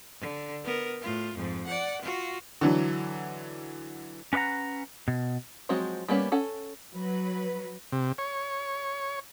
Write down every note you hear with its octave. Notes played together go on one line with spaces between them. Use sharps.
D3
B3 A#4
A2 F4
F2 G#2
D5 F#5
F4 F#4
D3 E3 F#3
C#4 B4 D5 F#5 A#5
B2
F3 F#3 G#3 C4 F#4
G3 A#3 B3 C#4
C#4 A4 F#5
F#3 B4
C3
C#5